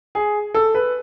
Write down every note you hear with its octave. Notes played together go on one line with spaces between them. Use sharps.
G#4
A4
B4